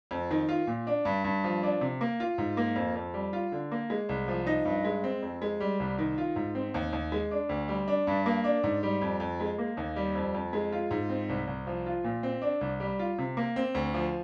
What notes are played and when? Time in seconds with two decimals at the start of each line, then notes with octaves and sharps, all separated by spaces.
0.11 F2
0.31 D#3
0.49 F4
0.67 A#2
0.87 D4
1.05 G2
1.24 G2
1.44 F3
1.63 D4
1.81 C3
2.01 A#3
2.20 F4
2.38 G#2
2.57 A#3
2.76 F2
2.95 F2
3.14 G3
3.33 F4
3.52 D3
3.72 A#3
3.90 G#3
4.09 C2
4.28 F3
4.47 D#4
4.65 G2
4.85 G#3
5.04 C4
5.22 F2
5.42 G#3
5.60 G3
5.80 C2
5.98 D#3
6.18 F4
6.36 G#2
6.55 C4
6.74 D#2
6.93 D#2
7.12 G#3
7.31 D4
7.49 D2
7.68 G3
7.88 D4
8.07 G2
8.26 A#3
8.44 D4
8.64 G#2
8.83 G3
9.01 F2
9.20 F2
9.40 G#3
9.58 A#3
9.77 D#2
9.96 G3
10.15 F2
10.34 F2
10.53 G#3
10.72 F4
10.91 G#2
11.09 C4
11.29 C2
11.47 C2
11.67 F3
11.86 F4
12.04 A#2
12.23 C4
12.42 D4
12.61 C2
12.80 G3
12.99 F4
13.18 C3
13.37 A#3
13.56 C4
13.75 D2
13.94 F3